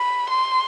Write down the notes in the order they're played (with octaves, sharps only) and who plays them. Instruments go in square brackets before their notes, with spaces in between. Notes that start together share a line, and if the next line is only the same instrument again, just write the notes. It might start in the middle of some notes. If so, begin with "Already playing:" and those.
Already playing: [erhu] B5
C6